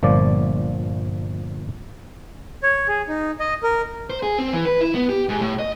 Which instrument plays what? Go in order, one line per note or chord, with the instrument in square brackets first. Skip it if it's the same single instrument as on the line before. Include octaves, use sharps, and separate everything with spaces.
[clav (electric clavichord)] G1 A#2 F3 D5
[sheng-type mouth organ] C#5
G#4
D#4
D#5
A#4
[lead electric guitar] C5
G#4
C4
E3
B4
E4
B3
G4
G#2
A2
D#5